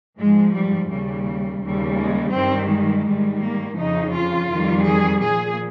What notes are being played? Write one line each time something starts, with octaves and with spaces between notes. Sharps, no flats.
G#2 F3 G#3
G3
D#2 C#3 G3
D#2 C#3 G3
G#3
G2 D#3 G3 C4
G#3
G#2 D#3 G3
A#3
F2 C#3 F3 D#4
F4
F2 D#3 G3
G#4
A#2 F3 G#4